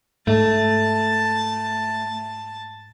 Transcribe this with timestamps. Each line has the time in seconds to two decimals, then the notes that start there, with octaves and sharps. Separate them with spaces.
0.27 G#2 A3 A5